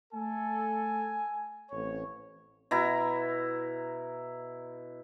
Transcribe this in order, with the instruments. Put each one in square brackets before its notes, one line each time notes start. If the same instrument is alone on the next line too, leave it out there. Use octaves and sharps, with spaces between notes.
[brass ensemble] A3 A4 [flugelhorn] G#5
[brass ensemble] A1 C4 C#5
[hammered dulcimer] B2 E4 A#5